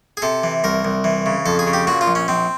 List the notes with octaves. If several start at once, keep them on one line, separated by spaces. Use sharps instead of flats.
G#4
C3 A4
E3
C2 A#4
C2
E3
C#3
F2 A4
G#4
C#3
G4
A#2 F#4
F4
A#1
C#4
A#1 C4